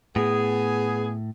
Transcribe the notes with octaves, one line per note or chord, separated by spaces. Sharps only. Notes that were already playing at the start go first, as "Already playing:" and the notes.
A2 B3 G#4